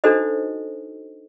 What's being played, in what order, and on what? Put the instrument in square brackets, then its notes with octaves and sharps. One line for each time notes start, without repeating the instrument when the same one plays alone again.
[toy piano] D4 D#4 F#4 A4 C5 D#5